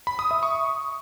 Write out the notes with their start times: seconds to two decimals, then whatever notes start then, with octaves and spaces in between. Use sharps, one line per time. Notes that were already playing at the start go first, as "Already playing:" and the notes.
0.07 B5
0.19 D#6
0.31 E5
0.43 C#6